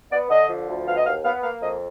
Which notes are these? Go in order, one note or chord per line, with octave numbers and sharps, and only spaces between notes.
B3 D5
D3 D#5
F3
D2
B3 F5
D#5
D#2 F5
B3 F5
A#3 F5
F2 D#5